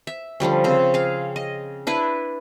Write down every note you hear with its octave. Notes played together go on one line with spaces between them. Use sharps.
E5
D3 F3 G3 C#4
C#3 C4
G#4 F5
D#5
D4 E4 B4